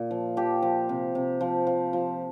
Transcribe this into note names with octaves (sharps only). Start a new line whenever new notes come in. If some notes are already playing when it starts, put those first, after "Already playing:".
Already playing: A#2
F3
F3 G4
F3
C3
C3
F3
F3
F3